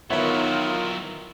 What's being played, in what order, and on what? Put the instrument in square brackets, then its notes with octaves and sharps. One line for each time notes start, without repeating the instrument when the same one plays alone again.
[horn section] D#3 F4 [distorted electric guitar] F#3 E4 [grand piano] B3 C#5 E5